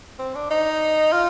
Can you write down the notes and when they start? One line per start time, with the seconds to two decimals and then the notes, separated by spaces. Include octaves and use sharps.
0.19 C4
0.35 D4
0.50 D#4
1.12 F4